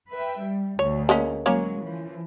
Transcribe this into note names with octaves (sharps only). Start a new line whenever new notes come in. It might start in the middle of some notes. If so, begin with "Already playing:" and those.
B4 E5 G5
G3
D2 C#5
G#3 A#3 C#4
F#3 G#3 A#3 C#4 C#5
E3 F3